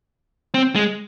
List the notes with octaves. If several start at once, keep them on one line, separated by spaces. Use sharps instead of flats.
C4
G#3